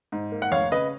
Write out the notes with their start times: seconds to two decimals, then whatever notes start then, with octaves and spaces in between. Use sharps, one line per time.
0.12 G#2
0.32 A#3
0.42 F#5
0.51 F1 C#5 F5
0.72 C#3 B4 D#5